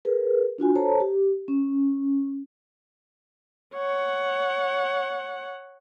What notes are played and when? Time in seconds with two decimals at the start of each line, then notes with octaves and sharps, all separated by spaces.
0.05 G#4 A#4 B4
0.58 D4 F4 F#4 G#5
0.75 A4 C5 C#5 A5 A#5
1.00 G4
1.48 C#4
3.75 C#5 F#5